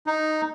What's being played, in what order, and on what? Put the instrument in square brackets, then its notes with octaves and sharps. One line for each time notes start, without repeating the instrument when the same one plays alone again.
[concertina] D#4